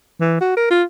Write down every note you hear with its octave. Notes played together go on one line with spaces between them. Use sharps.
E3
F#4
A#4
F4